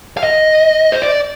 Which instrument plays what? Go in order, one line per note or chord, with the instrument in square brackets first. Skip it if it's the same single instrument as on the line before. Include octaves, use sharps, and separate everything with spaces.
[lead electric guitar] F5
D#5
C5
D5